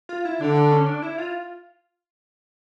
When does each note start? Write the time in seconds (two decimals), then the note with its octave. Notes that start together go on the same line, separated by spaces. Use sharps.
0.09 F4
0.25 E4
0.40 D3 D4
0.56 D4
0.72 C#4
0.86 D4
1.02 E4
1.18 F4